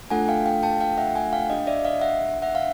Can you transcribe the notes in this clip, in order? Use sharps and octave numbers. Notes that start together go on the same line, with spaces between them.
A3 D4 F4 A4 F#5 G#5
F5 G5
F5 G5
G5 A5
F5 G5
E5 F#5
F#5 G#5
F5 G5
D4 G4 D#5 F5
D5 E5
D#5 F5
E5 F#5
E5 F#5
F5